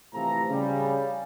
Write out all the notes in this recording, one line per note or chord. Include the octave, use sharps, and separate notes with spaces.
A2 C3 E3 F3 A4 A#5
C#3 G3